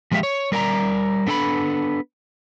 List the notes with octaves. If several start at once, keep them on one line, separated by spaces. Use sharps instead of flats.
F3 G#3 B3 G4 E5 F5
C#5
G3 A#4 D5 G#5 A#5
B3 D4 A4 G#5 B5